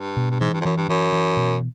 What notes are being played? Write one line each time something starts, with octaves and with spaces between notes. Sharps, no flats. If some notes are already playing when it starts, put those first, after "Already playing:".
Already playing: G2
B2
G2
G#2 E3
G2
F2
F#2 E3
G2
F#2 E3
E3
B2